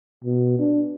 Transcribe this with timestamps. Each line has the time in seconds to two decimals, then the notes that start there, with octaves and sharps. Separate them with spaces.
0.24 B2
0.59 D4